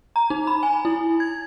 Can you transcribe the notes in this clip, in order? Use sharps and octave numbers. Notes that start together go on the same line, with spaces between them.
A#5
D#4
B5
G#5
E4
G#6